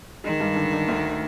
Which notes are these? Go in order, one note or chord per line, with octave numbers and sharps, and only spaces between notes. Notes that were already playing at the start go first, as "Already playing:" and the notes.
D#3 G#3
G2
D3
D3
D2